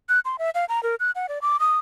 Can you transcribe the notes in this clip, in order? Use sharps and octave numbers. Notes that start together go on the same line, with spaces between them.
F#6
C6
E5
F5
A#5
A#4
F#6
F#5
D5
D6
D#6